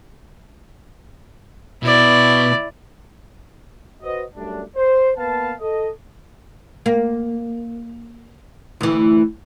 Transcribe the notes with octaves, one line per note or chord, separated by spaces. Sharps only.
B2 E4 D5
F#4 B4 C5 D#5
F#2 G3 A3 D4
C5
A#3 B3 B4 F5 A5
A4 D#5
A#3
D2 E3